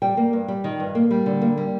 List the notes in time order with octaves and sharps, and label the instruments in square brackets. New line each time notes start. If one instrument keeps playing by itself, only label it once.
[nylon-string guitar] G3 G5
A#3
G2
G3
D#3
G2
A#3
G3
D3
A#3
G3